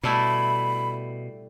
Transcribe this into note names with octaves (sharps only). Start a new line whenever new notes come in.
B2 G3 A3 E4 B5